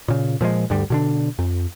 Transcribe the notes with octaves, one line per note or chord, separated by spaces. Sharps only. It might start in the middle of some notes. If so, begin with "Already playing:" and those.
A#2 C#3
A#2 F3 G3 G#3
D2 G2 D3 G3
B2 D3 D4
F2